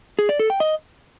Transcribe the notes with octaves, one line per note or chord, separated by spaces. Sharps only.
G#4
D5
A4
G5
D#5